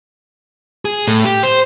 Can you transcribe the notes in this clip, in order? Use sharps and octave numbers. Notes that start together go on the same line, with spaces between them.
G#4
A2
G4
C5